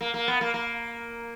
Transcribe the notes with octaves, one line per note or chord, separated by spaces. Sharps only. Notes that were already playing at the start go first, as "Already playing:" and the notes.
A#3
A#3
B3
A#3
A#3